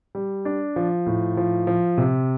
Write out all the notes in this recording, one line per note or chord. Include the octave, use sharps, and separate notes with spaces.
G3
D4
F3
A2
F3
F3
C3